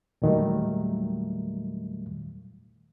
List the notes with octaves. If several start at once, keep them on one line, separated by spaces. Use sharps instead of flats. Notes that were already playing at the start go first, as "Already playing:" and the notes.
E2 A#2 D#3 F#3 G3 A3